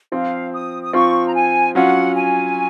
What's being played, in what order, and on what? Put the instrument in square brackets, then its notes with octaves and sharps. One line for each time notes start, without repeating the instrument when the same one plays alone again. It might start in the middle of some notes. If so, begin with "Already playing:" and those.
[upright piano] F3 C4 F4 [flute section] F5
[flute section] D#6
D#6
[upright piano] F3 C4 F4 [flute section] C#6
[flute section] A#5
G#5
[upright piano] F#3 C#4 F4 [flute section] F#5
[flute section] G#5